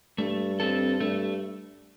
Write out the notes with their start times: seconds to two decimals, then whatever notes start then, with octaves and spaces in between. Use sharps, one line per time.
0.18 G2 A3
0.60 C4 A4
1.00 G2 A3